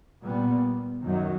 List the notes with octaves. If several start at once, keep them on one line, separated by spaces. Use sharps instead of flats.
A#2 G3 B3
F#2 D#3 F#3